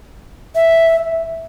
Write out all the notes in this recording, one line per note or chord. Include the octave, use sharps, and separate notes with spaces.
E5